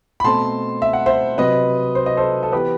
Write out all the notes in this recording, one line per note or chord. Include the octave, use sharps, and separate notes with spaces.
B5
B2 A3 C4 A5 C6
E5
F#5
C5 E5
C3 F#3 C4 B4 D#5
C5
D#5
A4 C5
A4
E3 B3 G4 B4